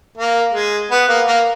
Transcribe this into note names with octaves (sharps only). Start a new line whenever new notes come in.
A#3
G#3
B3
A#3
A#3